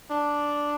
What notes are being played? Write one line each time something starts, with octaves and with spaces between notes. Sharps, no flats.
D4